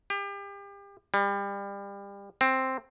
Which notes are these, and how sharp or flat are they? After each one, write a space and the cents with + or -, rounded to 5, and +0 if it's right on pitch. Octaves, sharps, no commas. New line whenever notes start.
G4 +35
G3 +30
C4 +5